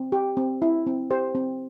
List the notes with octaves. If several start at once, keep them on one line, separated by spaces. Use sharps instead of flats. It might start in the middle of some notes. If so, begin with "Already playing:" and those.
Already playing: C4
G4
C4
E4
C4
G4 C5
C4